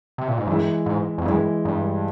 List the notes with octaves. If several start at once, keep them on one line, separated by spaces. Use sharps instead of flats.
C3
A#2
G#2
G2 E3 G#3 E4
G#2
F2
G2 E3 G#3 E4
G2